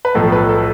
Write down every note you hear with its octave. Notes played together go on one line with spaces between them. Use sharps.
B4
B1 A2 F3 A4
B4
A4